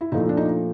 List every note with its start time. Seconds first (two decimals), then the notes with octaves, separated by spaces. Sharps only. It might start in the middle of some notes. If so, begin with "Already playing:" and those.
0.01 E4
0.12 A#2 F3 A3 D#4
0.29 D4
0.37 D#4